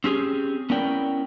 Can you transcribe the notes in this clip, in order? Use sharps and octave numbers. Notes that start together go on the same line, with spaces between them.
C4 C#4 G4 G#4
B3 C#4 E4 A#4 D5 G5